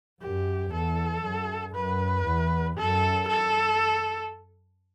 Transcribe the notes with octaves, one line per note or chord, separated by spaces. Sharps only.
F#2 G4
E2 A4
F#2
F#2 B4
E2
F#2 A4
A4